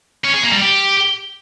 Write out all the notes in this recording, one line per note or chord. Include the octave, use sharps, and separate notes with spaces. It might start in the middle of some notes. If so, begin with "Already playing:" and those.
C#4
G#4
A#3
G3
G4